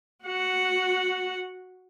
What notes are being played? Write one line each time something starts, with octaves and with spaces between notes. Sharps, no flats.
F#4 F#5